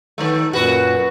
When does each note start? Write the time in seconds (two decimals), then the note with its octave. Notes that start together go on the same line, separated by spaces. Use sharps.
0.18 D#3 F#3 A3
0.53 F#2 A#2 F#4 B4